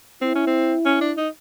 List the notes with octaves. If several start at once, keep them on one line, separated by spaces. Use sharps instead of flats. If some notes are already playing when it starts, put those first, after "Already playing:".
C4 E4
C#4
C4
C#4
D4
D#4